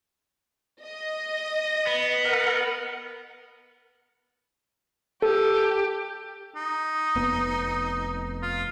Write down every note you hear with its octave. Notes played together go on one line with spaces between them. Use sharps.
D#5
B3
A#4 F#5
G4 A4
D#4
F1 B3
F4